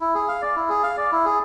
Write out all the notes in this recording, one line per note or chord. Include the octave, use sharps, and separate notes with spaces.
E4
G#4
F5
D5
E4
G#4
F5
D5
E4
G#4